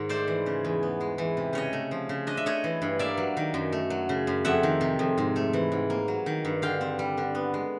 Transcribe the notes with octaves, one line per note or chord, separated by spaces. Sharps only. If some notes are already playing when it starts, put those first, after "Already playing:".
Already playing: G#2 D#3
A3 C5 D5
E3
C#3
E2
B3
G#3
E3
C3
C#3 C#5 D#5
A3
F3
C#3
D4 D#5
E5
A3 C#5 D#5
E3
G2
A#3 D5 E5
F#3
D#3
F#2
A3
F#3
C#3
F#2
F2 E5 F#5
D#3
C3
F2
G#2
A3
E3
G#2
A#3
F#3
D#3
G2
D3 F5 G5
C4
G3
D3
B3
G#3